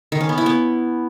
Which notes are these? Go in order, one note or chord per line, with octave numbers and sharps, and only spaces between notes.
D#3
C#4
B3
E4
B3